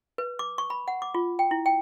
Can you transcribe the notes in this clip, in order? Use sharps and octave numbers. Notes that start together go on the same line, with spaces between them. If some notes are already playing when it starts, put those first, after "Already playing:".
B4
D6
C#6
B5
F#5
D6
F4
G5
E4
G5